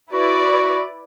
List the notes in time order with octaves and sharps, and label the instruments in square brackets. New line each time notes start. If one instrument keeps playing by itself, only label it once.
[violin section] E4 B4 D5 [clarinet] F#4